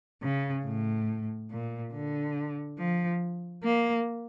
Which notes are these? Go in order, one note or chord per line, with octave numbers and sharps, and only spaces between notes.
C#3
A2
A#2
D3
F3
A#3